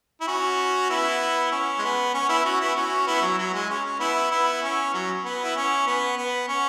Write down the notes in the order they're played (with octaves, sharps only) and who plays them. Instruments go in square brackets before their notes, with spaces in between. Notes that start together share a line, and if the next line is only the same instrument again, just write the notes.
[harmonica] E4
C#4 F#4
B3 E4
C#4
G#3
B3
C#4
B3 E4
C#4 F#4
B3 E4
C#4 F#4
B3 E4
F#3
F#3
G#3
C#4
C#4
B3 E4
B3 E4
C#4
F#3
B3
E4
C#4
B3
B3
C#4